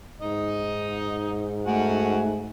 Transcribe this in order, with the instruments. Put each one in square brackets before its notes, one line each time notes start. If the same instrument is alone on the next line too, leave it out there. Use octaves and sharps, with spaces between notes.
[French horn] G#2 [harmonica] D#4 D#5
[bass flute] A3 [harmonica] F#4 F#5 G#5